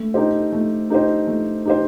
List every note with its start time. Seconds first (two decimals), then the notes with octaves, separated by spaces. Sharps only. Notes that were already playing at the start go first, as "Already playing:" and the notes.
Already playing: A3
0.14 D#4 G4 C5
0.52 A3
0.90 D#4 G4 C5
1.27 A3
1.65 D#4 G4 C5